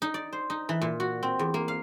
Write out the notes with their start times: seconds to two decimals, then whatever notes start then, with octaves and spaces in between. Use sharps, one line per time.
0.02 D#4
0.14 D5
0.33 C5
0.50 D#4
0.69 E3
0.82 A#2
1.00 F#4
1.23 C4
1.39 E2
1.54 A#3
1.68 F5